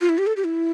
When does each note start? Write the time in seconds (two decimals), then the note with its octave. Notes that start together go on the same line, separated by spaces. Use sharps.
0.01 F4
0.09 E4
0.18 G4
0.27 A4
0.37 G4
0.45 E4